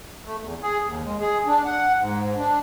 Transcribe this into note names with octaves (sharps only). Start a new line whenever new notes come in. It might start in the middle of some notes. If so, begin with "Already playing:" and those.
A3
E2
G#4
D#2
G#3
G#4
D4
F#5
G#2
D4